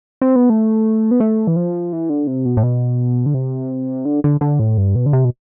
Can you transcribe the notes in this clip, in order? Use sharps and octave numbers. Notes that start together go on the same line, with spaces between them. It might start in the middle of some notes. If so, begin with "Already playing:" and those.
C4
B3
A3
B3
A3
E3
F3
E3
D3
C3
B2
A2
B2
D3
C3
D3
D3
D3
A2
G2
B2
D3
C3
B2